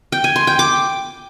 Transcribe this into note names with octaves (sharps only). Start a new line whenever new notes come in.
G5
G#5
C6
G5
D6